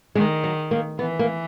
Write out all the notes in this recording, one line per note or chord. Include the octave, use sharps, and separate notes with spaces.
D#3 G#3
F#3
A#3
E3 B3
A#3